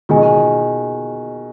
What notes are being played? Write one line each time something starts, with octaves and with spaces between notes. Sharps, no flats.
B2 D#3 F4 G#4 D#5 G#5